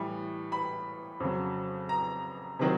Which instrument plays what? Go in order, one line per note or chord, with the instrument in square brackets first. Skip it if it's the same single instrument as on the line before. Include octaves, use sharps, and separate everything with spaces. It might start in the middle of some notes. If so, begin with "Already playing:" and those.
Already playing: [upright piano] A2 E3 G3
B5
F2 C#3 F#3
A#5
C3 D#3 F#3